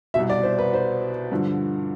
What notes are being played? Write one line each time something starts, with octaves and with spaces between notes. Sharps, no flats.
C2 B2 E5
D5
C5
B4
C5
G2 D3 F3